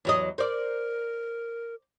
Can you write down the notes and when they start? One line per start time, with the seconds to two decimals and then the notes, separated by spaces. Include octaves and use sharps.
0.05 E2 F#3 D#5
0.38 A#4 C5 D5